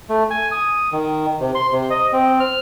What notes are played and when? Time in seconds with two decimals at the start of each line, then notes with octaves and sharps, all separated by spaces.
0.09 A3
0.30 G#5
0.52 D#6
0.92 D#3
1.40 C3
1.55 C6
1.72 C3
1.90 D#5
2.13 C4
2.40 F6